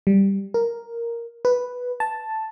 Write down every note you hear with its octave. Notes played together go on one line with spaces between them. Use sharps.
G3
A#4
B4
A5